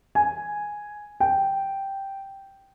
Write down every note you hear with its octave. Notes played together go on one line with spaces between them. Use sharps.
G#5
G5